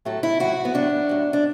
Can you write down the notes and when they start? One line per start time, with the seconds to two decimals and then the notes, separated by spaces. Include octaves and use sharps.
0.05 A2 F#3 A4
0.23 E4
0.40 A2 F#3 F#4
0.65 B3
0.74 A2 F#3 D4
1.09 A2 F#3
1.33 D4